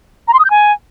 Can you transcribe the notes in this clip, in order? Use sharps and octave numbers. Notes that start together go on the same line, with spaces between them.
A#5
C6
D#6
G6
G#5